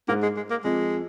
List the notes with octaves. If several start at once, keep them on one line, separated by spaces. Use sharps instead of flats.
G#2 A#3
G#3
G#3
A#3
F2 G#3